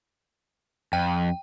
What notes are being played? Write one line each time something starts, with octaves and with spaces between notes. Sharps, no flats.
F2 G5